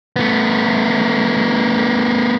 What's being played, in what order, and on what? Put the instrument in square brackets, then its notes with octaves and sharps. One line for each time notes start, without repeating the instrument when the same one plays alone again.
[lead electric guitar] A3 B3